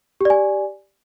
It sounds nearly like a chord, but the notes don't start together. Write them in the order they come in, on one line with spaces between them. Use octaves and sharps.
G4 D5 G#5